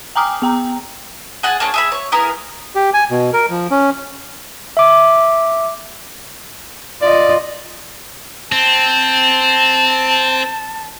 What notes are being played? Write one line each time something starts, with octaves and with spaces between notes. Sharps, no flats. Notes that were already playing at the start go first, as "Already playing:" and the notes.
G5 G#5 A#5 D6 D#6 F6
B3 G5 A#5
G#4 F#5 G#5 A5
A#3 D4 G#4 C#5
G#4 E5 B5
C#5
B3 E4 G#4 A#4
G4
G#5
B2
A#4
F3
C#4
E5 D6
F4 D5 D#5
C4 A5